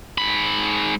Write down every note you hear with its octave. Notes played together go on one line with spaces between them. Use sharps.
G#2 B5